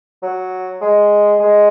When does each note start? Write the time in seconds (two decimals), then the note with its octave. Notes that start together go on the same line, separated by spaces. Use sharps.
0.23 F#3
0.81 G#3
1.40 G#3